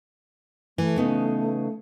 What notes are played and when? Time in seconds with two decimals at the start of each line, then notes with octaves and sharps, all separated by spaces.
0.78 E3 A3
0.96 C#3 B3 D#4